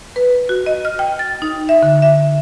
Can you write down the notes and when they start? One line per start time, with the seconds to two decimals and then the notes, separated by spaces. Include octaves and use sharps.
0.16 B4
0.49 F#4
0.66 D#5
0.85 F6
0.99 G5
1.19 A6
1.42 D#4
1.69 E5
1.83 D3
2.02 E5